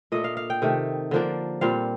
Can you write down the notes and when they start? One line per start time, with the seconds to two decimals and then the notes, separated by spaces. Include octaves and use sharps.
0.12 A#2 A3 D4 D#5
0.24 F5
0.37 F5
0.50 G5
0.62 C3 D#3 A3
1.11 D3 F3 A#3 D4
1.61 A#2 G3 C4 F5